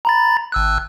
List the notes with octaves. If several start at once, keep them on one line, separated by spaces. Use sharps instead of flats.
A#5 B5 A6
G#1 E6 F#6